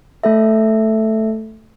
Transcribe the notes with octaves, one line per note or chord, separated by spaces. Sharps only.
A3 A4 E5